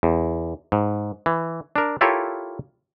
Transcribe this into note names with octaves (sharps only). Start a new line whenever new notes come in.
E2
G#2
E3
D4 A#4
E4 F4 G4 A4 A#4 C#5